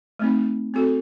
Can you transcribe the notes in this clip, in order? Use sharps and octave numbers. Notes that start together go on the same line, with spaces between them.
A3 C4 D#4
C4 F#4 A4